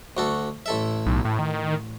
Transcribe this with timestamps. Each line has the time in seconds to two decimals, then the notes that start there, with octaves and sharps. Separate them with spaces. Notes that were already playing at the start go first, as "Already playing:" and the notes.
0.17 D2 F#4 A4
0.66 A1 A4 E5
1.06 B1
1.25 A2
1.39 D#3